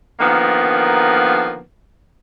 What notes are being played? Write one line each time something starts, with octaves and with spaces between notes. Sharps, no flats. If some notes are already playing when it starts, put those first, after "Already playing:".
D3 D#3 F3 A#3 B3